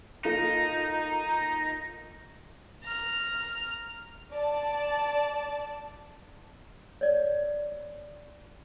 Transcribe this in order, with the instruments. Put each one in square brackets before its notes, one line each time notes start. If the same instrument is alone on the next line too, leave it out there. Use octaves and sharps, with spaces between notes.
[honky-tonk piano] A#3 F4 A4 [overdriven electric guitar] D#4
[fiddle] A#5 F6
[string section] D5 A5
[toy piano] C#5 D5